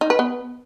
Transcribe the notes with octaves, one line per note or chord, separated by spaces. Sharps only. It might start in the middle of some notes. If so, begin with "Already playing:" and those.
D#4
B4
B3